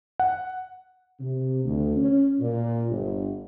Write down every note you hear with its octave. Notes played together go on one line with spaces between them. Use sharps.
F#5
C3
D2
C#4
A#2
G1